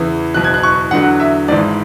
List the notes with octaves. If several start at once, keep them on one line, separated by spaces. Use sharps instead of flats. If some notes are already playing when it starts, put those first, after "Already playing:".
Already playing: E2 C#3 E3
F#1 E2 B2 F#6
G#6
F#6
C#6
E2 D3 F#3 F#5
E5
G#1 G#2 E3 D5